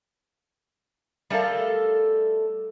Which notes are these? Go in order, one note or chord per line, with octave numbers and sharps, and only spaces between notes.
G3 A3 A4 A#4 F5